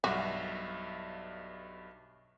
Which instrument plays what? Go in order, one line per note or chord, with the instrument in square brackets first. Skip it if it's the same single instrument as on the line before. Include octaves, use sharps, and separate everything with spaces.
[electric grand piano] B1 G2 E5 [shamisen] F#4